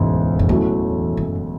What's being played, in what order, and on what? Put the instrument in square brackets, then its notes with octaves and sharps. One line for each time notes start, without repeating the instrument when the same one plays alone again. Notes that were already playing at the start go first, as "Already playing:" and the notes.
Already playing: [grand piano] E1 D2 C#3 [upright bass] G#2
[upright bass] F#2
[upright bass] E2 [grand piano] A2 F#3 A3 C#4
[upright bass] F#2